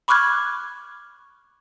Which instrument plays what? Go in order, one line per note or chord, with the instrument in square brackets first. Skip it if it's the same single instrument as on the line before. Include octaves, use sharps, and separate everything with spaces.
[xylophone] B5 C#6 D6 F6 F#6 G#6